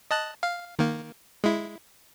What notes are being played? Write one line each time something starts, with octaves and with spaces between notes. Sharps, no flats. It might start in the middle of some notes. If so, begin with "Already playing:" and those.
D#5 A5 F#6
F5
D#3 A#3
G#3 E4